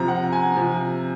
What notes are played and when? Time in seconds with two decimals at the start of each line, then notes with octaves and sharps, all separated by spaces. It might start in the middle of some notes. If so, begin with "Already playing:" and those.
Already playing: C3 F3 A#5
0.08 F#5
0.32 G#5
0.56 C3 F3